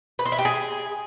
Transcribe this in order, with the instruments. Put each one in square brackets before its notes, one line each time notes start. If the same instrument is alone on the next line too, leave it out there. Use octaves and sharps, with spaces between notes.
[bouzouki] B4
C5
E4
G4
G#4